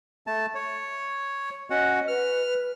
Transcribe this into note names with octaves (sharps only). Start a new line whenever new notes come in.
A3 A5
C#5
C#4 F#4 D#5 F#5
B4 F6